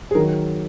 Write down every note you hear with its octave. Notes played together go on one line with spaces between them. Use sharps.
G#4
D#3 F#3 A#4